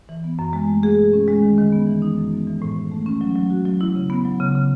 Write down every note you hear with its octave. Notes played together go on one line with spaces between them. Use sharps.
E3
B3
F#2
G#3
A3
G#4
B2
C#4
G#3
D#3
D#3
B3
E3
D#4
F#2
B3
E3
A2
A2
A3
C#4
F#3
F#3
F#4
F#3
E4
C#3
B3
F#3
C#3
C#3